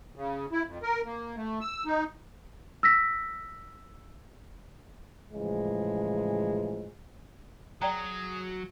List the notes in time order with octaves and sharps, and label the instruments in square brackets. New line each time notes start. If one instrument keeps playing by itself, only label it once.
[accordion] C#3
E4
F2
A#4
A#3
A3
E6
D#4
[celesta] E6 A#6 B6
[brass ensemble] A2 C#3 E3 F3 G#3
[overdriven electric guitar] F#3 [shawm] G#4 [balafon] D5 G5 A#5